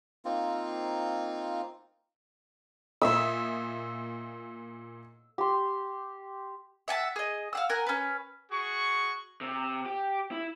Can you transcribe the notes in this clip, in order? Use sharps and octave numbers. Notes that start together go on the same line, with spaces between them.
A#3 C4 D#4 F4
A#2 E5 D#6 E6
G4 C6
E5 F#5 G#5 A5
G#4 D#5
F5 F#5 E6
A#4 F#5 G#5
C#4 B4
F#4 G#4 C#6
C3
G4
E4